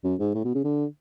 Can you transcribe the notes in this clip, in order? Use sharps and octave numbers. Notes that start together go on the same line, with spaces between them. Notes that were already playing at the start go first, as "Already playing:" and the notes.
F#2
G#2
A2
B2
C#3
D3